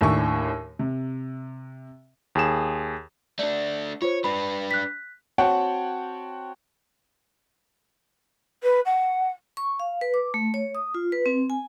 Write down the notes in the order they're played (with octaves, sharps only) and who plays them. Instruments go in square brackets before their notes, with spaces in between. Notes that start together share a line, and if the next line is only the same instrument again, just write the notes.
[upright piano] D#2 A2 D4 E4 G#5 C#6
C3
[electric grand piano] D#2 G#4 E7
[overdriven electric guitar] A3 D4 [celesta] D5
[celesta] F4 C5 [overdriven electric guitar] C#5
[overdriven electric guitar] D4 B4 [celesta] B5
[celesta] F#6 B6
[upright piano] C4 F#4 C#5 F#5 G5 A5
[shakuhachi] B4
F#5
[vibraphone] C#6
F5
B4
D6
A3
C#5
D#6
F4
B4
C4
G#5